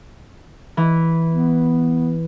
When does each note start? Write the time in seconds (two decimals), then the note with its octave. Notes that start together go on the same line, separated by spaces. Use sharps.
0.77 E3
1.32 B3